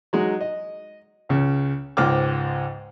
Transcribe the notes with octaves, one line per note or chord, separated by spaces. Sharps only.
F#3 G#3 D#4
D#5
C#2 C#3
C#2 G#2 C5 G5 D6 F6